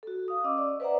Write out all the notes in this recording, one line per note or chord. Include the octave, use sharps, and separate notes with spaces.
F#4 A4
F5 D#6
C#4 D#5 D6 E6
D5
B4 C5 D5 E5 F#5 A#5